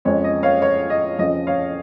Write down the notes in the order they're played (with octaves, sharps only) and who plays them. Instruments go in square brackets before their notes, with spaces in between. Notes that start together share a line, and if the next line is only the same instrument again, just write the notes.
[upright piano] F2 C#3 F3 G#3 C#5
D#5
C#5 F5
C#5
D#5
F2 C#3 F3 D#5
C#5 F5